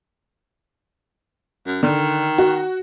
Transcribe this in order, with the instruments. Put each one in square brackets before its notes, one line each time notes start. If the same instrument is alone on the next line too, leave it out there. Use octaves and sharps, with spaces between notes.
[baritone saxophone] F#2
[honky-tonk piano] D3 [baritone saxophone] D#3
[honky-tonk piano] F#4